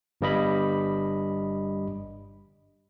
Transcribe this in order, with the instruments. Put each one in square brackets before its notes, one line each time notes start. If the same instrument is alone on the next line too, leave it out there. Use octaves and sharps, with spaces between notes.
[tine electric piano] G1 G2 G3 D#5 B5